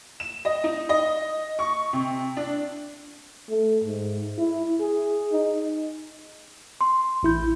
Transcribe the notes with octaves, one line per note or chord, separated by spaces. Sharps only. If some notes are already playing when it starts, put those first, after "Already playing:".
E7
D#5
D#4
D#5
C#6
C3
D4
A3
G#2
E4
G#4
D#4
C6
A1 E4 G6